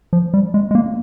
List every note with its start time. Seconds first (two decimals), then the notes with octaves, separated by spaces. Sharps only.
0.13 F3
0.34 G3
0.54 G#3
0.71 G#3
0.75 A#3